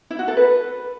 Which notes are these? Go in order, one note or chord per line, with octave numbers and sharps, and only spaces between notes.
E4
F#4
A4
B4